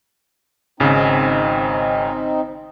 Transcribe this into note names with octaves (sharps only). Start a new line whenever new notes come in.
G#1 C#3 C4 D#4